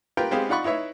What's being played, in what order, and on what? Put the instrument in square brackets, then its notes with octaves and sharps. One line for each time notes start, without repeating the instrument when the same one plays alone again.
[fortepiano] F4 G4 A#4 B4 G5
G#3 B3 C4 G4 G#4 F5
D#4 F4 D5 F#5 B5 C#6
D#4 E4 B4 C#5 E5